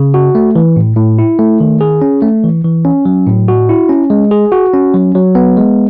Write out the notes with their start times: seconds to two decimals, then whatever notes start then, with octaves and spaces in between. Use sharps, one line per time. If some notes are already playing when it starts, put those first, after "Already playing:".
Already playing: C#3
0.14 F#4
0.35 A3
0.56 E3
0.76 A2
0.97 A2
1.19 E4
1.39 A3
1.60 D#3
1.81 G#4
2.02 C#4
2.22 A3
2.44 E3
2.64 E3
2.85 C#4
3.05 F#3
3.27 A2
3.48 F#4
3.69 E4
3.89 C#4
4.10 G#3
4.31 G#4
4.52 F#4
4.74 C#4
4.94 F#3
5.15 F#3
5.35 B3
5.57 G#3